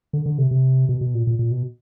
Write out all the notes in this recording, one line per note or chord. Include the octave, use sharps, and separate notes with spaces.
D3
D3
C3
C3
B2
B2
A#2
A#2
A#2
B2